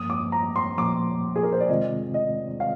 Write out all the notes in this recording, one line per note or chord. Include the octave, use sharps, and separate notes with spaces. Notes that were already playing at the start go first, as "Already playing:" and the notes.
Already playing: G2 F3 A#3 D#6
D6
A#5
C6
A#2 F3 A#3 D6
G#4
A#4
C5
D5
C3 D#3 G#3 C4 F4 D#5
D#5
F5